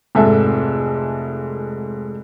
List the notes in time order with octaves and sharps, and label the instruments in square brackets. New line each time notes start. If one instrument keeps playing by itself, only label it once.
[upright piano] F1 G#2 G#3 A4 E5